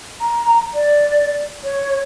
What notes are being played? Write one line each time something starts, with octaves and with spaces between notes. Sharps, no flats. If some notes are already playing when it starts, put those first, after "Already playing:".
A#5
D5
C#5